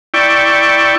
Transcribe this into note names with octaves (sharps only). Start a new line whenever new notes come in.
E4 D5 G5 C#6